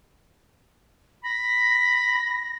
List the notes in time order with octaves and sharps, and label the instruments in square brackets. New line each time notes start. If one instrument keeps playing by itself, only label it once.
[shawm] B5 [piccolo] A#6